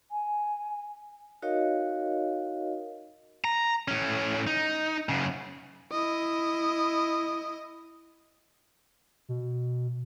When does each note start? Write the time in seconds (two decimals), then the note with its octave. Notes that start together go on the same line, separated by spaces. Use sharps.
0.11 G#5
1.42 D#4 F#4 A#4 C#5 D#5 F5
3.44 A#5
3.88 A2 C#4
4.47 D#4
5.09 F#2 C#3
5.91 E4 D#5
9.29 B2